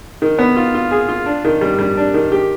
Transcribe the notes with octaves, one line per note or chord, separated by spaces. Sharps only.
D#3
B3
F4
F4
G#4
F4
D4
D#3
G3
G3
D4
D#3
G4